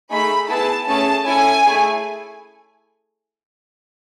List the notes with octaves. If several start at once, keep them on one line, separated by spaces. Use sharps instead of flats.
A3 D#4 G#4 B5
B3 E4 G#4 A5
A3 C#4 G#4 A5
C#4 E4 A4 G#5
A3 E4 G#4